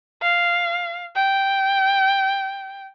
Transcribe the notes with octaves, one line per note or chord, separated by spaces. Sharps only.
F5
G5